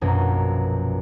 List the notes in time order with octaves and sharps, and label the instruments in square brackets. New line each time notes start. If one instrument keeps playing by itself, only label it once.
[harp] A#1 F#2 B2